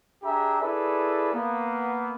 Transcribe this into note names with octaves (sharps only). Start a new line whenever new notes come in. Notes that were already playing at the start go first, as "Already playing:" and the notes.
D4 G4 G#4 E5 A#5
E4 G#4 A4 B4 D5
A#3 B3